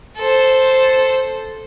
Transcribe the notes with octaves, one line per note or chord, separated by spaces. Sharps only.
A4 C5